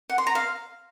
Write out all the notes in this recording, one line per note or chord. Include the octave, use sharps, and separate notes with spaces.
F#5
C6
A#5
F5